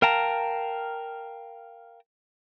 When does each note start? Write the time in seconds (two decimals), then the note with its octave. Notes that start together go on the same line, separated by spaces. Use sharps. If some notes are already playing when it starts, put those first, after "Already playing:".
0.02 A#4 F5 G5 A5 A#5